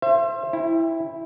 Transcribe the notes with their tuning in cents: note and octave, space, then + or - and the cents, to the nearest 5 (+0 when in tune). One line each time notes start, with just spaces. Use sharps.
C5 +20 E5 +35
E4 +0 G5 +25